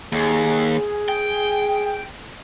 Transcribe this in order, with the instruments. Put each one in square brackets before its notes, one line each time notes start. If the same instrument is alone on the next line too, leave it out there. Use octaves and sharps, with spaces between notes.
[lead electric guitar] D#2 [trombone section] G#4
[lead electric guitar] G5